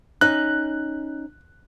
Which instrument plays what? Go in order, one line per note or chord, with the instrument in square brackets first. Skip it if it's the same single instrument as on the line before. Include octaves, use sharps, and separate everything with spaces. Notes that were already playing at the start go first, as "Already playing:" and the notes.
[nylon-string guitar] C#4 D#4 [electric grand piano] F#6